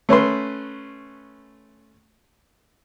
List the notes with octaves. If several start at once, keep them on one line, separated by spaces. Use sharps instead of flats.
A3 C#4 B4 C6